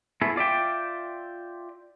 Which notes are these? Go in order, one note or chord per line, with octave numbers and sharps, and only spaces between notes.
A3 B3 E4 G#4
F4 D5 E5 G5